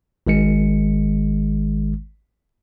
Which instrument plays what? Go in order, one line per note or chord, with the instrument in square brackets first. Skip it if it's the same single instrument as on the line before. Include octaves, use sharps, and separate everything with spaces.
[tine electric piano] G#1 D#3 G#3 C#7